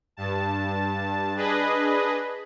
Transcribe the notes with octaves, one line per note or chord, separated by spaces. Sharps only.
G2 A5
D4 G#4 B4 D#5